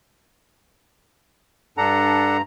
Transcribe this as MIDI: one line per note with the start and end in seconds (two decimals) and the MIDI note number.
1.77 2.42 43
1.77 2.37 62
1.77 2.37 69
1.77 2.37 78
1.77 2.42 82